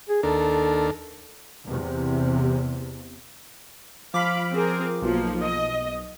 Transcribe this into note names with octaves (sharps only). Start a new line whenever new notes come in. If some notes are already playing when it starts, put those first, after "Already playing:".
G#4
D#2 D4 A4 A#4
E2 C3
F3 F5 B5 D6
C4 G#4 A#4
B1 F3 A#3
D#5